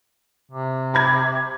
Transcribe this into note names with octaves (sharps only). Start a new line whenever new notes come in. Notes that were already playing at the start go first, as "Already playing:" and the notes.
C3
A#5 B5 G#6